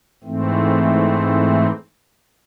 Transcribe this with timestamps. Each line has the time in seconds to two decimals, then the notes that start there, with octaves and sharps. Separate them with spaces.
0.24 G#2 E3 A3 C4